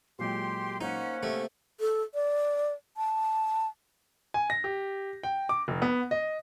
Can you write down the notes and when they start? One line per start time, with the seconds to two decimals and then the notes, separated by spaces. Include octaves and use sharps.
0.19 A#2 F#3 G#3 G4 C6
0.81 A#3 C#4 D#4 C5 F#5
1.23 C3 A3
1.80 A4
2.14 D5
2.97 A5
4.34 G#5
4.50 A#6
4.64 G4
5.23 G5
5.49 D6
5.68 F1
5.82 B3
6.11 D#5